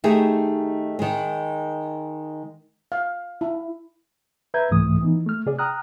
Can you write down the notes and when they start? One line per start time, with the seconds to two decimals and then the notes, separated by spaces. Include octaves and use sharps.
0.04 D#3 A3 D#4 G4 G#4
0.99 D#3 G#3
2.92 F5
3.41 E4
4.54 B4 E5 A#5 G6 G#6
4.71 C2 G#2 E3 A3 D#6
5.01 E3 B3 D#4
5.26 A3 F6
5.46 C3 G#4 D5
5.59 G5 A#5 D#6 F6 F#6